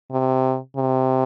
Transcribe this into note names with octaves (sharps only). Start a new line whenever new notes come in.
C3
C3